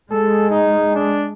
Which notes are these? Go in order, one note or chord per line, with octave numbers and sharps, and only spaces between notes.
G#3 A4
D#4
D4